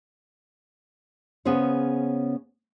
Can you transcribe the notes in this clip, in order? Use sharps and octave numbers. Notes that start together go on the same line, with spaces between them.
C#3 B3 C#4 G#4 C5 C#5